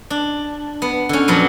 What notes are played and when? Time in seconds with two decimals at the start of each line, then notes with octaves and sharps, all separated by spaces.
0.10 D4
0.82 B3
1.09 D3 C#4
1.28 F2 A#2 F3 F#3 B3